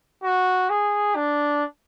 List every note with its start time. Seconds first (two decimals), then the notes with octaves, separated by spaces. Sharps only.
0.24 F#4
0.70 G#4
1.16 D4